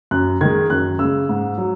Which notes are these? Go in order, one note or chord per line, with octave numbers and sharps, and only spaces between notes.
F#2 F#6
D#3 G#3 G#6
F#2 F#6
C#3 E6
G#3
G#2
F#3